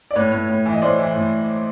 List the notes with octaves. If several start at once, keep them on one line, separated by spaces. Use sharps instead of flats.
D5
A2 B4 C#5
A2
A2
E3
D#5
A2 C5 D5
E3
A2